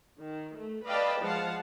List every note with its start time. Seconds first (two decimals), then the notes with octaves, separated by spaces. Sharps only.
0.19 D#3
0.55 A3
0.86 B4 D5 D#5 F5 G5 A5
1.21 F3 G#3 F5 F#5 A5